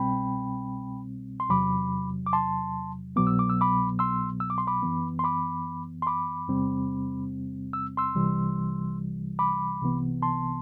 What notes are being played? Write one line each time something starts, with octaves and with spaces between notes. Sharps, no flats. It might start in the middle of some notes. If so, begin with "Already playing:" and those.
Already playing: C2 B2 G3 C4 G5 B5
C6
E2 C3 F#3 B5 D6
D6
A5 C6
C2 B2 F#3 B3 D6
E6
D6
E6
B5 D6
C6 E6
E6
D6
C6
B5 D6
F#2 E3 B3
C6
B5 D6
C6
B5 D6
E2 C3 G3 C4
E6
C6 E6
C2 C3 E3 G3
B5 D6
C2 C3 E3 B3
A5 C6